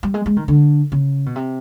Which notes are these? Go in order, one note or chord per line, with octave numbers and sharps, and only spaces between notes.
G3
G#3
G#3
D#3
D3
C#3
B2
C3